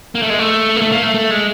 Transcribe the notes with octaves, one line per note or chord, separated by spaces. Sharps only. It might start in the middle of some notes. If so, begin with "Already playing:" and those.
A#3
A3
G#3
A3
A#3
A3
A#3
A3
A3
G#3